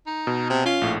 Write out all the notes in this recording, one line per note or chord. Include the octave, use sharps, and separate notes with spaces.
D#4
B2
C3
C#4 F4
A#1 A2